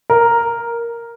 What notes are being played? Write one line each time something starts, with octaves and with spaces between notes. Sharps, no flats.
A#4